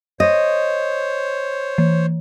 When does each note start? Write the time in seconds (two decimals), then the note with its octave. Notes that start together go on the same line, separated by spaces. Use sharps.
0.20 C5 C#5 D#5
1.78 E3